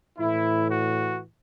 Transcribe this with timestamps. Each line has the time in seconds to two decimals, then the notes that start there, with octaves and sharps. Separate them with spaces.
0.17 A2 E3 E4
0.71 F#4